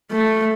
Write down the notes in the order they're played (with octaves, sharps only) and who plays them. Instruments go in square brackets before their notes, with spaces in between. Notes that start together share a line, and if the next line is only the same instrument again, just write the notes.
[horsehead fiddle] A3